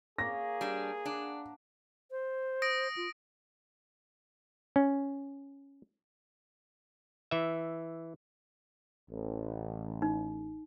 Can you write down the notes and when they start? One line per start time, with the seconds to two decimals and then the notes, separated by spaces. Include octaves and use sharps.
0.18 A#3 G#4 C#5 A#6
0.61 G3 D4
1.05 D4 D5 F#5
2.11 C5
2.62 D#6 A#6 D7
2.97 F4
4.76 C#4
7.31 E3 E5
9.11 A1
10.02 D#4